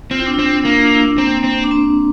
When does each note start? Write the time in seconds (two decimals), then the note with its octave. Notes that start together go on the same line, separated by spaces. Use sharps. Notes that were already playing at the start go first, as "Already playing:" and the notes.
0.11 C4 F4
0.19 E4
0.27 D4
0.34 C4 E4
0.65 A#3 D4
0.75 E4
0.85 D4
0.95 E4
1.06 D4
1.18 A#3 C4
1.44 C4
1.64 D4
1.71 C4